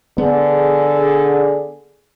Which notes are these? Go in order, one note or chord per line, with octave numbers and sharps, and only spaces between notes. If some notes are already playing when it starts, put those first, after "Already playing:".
D3 B3 G#4